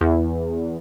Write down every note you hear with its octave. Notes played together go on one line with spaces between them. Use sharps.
E2